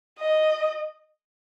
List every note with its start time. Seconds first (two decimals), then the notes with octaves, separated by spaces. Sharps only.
0.18 D#5